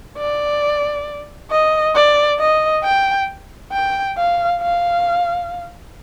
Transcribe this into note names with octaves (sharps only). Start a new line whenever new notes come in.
D5
D#5
D5
D#5
G5
G5
F5
F5